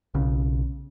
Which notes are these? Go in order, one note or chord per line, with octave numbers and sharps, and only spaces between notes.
B1 C#3